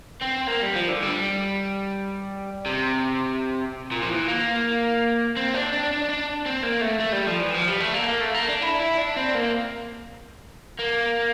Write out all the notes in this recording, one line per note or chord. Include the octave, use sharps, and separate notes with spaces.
C4
A#3
G3
F3
D3
G3
C3
A#2
F3
E3
A#3
C4
D4
D4
D4
D4
C4
A#3
A3
A3
G3
F3
E3
F3
G3
A3
A#3
A#3
A3
A#3
D4
E4
E4
D4
C4
A#3
A#3